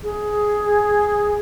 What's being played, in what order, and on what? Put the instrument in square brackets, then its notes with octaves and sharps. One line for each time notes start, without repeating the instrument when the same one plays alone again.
[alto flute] G#4